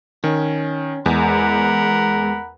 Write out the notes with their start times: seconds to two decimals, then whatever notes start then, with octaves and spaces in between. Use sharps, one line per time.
0.24 D#3 C#4
1.06 E2 G#3 A#4 F#5 B5